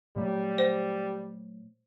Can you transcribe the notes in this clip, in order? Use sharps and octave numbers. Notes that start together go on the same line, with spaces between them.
A#2 F#3 G3 A3
C5